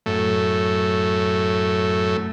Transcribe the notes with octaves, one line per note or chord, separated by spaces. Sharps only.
F#2 A2 A3